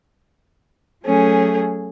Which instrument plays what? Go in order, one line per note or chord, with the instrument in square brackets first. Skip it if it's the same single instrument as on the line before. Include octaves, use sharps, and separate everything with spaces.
[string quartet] F#3 A3 C#4 G#4